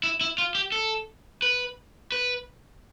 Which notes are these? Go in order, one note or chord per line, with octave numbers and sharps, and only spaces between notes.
E4
E4
F4
G4
A4
B4
B4